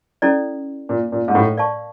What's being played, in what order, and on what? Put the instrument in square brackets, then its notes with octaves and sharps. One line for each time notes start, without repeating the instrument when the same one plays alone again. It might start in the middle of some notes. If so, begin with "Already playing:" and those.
[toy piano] C#4 E4 A4 D5
[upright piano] A#2
A#2
G#2
A2
[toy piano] A#4 D5 F5 A5 C#6